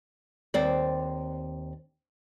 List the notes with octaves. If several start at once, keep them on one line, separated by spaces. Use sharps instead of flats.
D#2 C4 D5